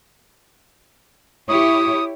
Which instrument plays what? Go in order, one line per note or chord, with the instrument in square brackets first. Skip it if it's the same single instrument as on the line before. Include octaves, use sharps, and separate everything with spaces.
[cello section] E4 G4 C#5 [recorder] D#6